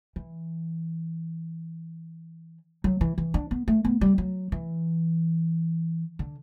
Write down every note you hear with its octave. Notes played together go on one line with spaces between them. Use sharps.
E3
F#3
E3
E3
D4
B3
A3
B3
G3
F#3
E3
D3